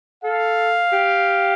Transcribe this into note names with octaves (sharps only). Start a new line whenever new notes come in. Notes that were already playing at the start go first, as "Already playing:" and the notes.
A4 F5
G4